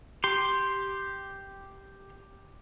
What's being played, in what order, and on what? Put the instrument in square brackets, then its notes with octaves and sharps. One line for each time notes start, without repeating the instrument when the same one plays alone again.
[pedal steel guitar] G4 C6